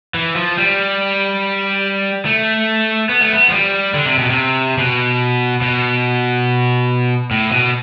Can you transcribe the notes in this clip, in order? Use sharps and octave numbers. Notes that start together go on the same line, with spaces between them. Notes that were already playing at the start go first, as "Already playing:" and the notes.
E3
F3
G3
A3
B3
A3
B3
F3
G3
D3
C3
B2
C3
B2
B2
A2
B2